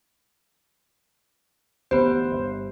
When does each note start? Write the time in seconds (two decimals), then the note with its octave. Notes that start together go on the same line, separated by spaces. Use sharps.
1.91 D2 A#2 E3 B3 G4 C5
2.31 G1